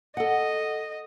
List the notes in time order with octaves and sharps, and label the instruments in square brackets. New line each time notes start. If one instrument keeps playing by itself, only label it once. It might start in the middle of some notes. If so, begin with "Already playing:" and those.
[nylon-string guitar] A4 F#5 [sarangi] D#5